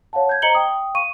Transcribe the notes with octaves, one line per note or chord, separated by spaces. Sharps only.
C#5 F5 F#5 A5
G6 G#6
C5 D#5 A#5 C#7 F#7 G7
G5 D#6
F5 C#6 D#7